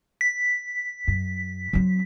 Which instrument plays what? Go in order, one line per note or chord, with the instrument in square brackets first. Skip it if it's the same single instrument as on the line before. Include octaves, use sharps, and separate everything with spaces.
[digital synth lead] B6
[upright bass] F#2
F#3 C4